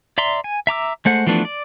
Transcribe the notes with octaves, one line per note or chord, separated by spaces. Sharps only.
D5 E5 A#5 C6
G#5
E5 A#5 D6 E6
G#3 A3 C5 F#5
E3 F3 A3 B3 D4
D5